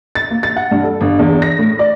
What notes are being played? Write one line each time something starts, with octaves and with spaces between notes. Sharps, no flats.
A6
A#3
A6
F#5
G2
A4
G1
E2
A#6
A2
D5